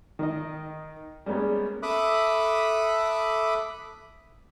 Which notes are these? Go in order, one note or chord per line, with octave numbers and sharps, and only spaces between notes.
D#3 D#5
G3 G#3 A#3 B3 C#4
A4 E5 B5 D6 D#6 F#6